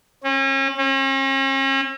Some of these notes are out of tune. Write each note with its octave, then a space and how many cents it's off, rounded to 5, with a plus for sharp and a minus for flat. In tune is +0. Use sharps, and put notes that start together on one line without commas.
C#4 -40
C#4 -45